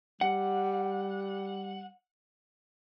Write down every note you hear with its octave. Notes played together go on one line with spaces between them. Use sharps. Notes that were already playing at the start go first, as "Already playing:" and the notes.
G3 F#5